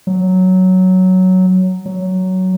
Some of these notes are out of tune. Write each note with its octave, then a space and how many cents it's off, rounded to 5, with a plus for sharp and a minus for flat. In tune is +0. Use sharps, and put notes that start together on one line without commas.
F#3 +5
F#3 +10